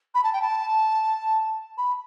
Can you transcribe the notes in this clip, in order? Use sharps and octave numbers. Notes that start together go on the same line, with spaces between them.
B5
A5
G5
A5
B5